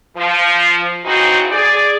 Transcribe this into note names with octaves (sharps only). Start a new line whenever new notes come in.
F3
C#3 E3 C4 D#4 F#4 C5
G#4 D5